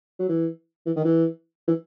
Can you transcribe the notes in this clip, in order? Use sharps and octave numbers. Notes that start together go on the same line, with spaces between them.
F#3
E3
E3
D#3
E3
E3